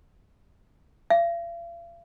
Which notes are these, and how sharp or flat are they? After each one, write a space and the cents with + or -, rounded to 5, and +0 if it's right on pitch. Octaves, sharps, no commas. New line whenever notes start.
F5 -45